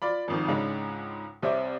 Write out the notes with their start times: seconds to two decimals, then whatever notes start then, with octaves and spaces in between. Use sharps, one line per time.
0.02 F4 D5 B5
0.28 G#1 F2 D#3
0.48 C#2 G#2 G#3 C#4 D4 B5
1.42 C2 C4 C#5 E5 D6